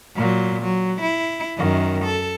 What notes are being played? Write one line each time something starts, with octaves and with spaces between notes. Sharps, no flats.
A#2 F#3
F#3
E4
F#2 D#3
A4